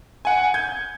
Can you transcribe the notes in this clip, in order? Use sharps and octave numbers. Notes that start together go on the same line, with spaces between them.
F#5 G#5
G6 G#6